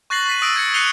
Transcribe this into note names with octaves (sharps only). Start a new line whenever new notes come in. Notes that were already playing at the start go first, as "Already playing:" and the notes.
C#6 F#6 A6 A#6 C7 F#7
B6 D#7
D#6 E6 A#6 D7 D#7
G#6 A#6 C#7
F#6 C7 C#7 D#7 F7 G7